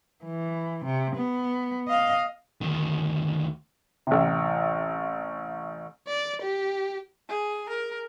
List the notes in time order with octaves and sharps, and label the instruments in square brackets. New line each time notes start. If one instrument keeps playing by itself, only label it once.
[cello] E3
C3
B3
D#5 F5
[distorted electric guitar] D2 D#3
[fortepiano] A1 C3
[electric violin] D5
G4
[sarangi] G#4
A#4